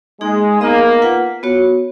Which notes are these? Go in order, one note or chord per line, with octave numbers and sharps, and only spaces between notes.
G#3 A#3 D#4 G#4
A#3 B3 D#4 G#4 D#5
F4 B4 F#5
B3 F#4 C#5